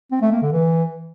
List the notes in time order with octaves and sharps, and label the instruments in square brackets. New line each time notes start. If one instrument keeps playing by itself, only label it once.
[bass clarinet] C4
A3
A#3
D3
E3